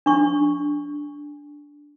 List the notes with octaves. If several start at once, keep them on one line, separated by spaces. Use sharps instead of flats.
D4 C#6